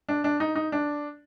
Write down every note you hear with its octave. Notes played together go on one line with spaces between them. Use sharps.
D4
D4
D#4
D#4
D4